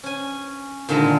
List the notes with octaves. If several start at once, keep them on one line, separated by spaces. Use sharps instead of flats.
C#4 G#5
A#2 D3 D#3 G#3 E5 A#5